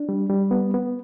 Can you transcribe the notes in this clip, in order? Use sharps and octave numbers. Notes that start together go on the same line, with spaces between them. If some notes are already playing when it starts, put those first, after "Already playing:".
Already playing: D4
G3
G3
B3
B3